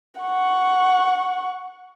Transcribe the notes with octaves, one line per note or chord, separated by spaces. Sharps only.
F#5 C#6